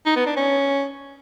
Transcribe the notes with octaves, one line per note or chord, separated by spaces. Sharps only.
D#4
B3
D4
C#4